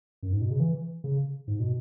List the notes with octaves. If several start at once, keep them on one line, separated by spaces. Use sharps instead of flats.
F#2
G#2
B2
C#3
E3
C#3
G#2
B2